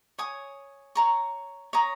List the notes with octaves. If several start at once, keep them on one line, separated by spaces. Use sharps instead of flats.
C#5 G#5 D#6
C#5 A#5 C#6
C#5 A#5 D#6